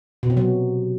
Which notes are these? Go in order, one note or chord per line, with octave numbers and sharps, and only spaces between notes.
B2
C3
F#3